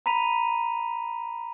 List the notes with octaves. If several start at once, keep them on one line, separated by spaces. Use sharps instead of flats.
A#5 B5 B6 D#7 F7